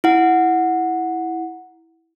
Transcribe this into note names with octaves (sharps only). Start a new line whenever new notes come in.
E4 F#5